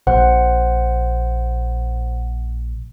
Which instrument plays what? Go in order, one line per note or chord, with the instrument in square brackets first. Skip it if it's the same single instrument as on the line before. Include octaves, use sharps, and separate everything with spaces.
[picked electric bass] A#1 [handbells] C5 F#5